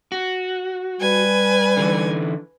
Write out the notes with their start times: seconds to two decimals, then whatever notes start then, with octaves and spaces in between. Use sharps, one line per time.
0.12 F#4
1.01 G3 B4 G#5
1.77 D3 E3